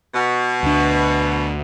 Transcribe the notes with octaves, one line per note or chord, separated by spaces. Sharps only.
B2
D2 D4